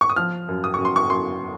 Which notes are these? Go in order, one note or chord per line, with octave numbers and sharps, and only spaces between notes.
C#6
D#6
F3 F6
F#2
D#6
F#2 C#6
C6
C#6
F#2 C6